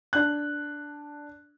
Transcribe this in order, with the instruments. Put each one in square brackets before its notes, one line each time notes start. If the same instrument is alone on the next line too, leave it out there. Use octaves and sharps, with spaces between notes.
[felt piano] D4 F#6